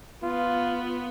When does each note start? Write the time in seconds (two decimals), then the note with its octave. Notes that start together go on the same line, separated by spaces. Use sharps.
0.23 B3 F4